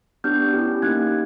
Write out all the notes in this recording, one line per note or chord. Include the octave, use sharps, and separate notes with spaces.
B3 D4 G4 F6 G6
C#4 E4 G4
A#3 D#4 G4 F#6 G#6